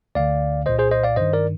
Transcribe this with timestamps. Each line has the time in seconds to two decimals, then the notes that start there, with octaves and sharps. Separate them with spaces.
0.15 D2 D3 D5 F5
0.66 C2 A#2 C5 D#5
0.79 G#4 C5
0.91 C5 D#5
1.04 D5 F5
1.16 G2 D#3 C5 D#5
1.33 A#4 D5